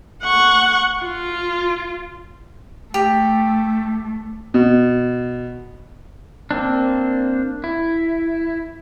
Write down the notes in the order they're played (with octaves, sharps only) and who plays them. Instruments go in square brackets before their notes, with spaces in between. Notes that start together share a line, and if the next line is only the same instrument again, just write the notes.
[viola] F#5 C#6
F4
[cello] A3 [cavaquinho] G4
[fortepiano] B2
[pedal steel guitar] A#3 C4 D4
E4